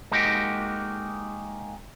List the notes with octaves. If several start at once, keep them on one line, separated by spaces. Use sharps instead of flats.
G#3 A#3 D#4 F#4 G4